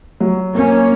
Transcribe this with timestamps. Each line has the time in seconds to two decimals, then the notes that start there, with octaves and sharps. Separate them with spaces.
0.20 F#3
0.53 A#3 C#4